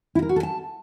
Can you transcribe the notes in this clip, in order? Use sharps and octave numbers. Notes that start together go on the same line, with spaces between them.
E4
A#4
F#4
A4
A5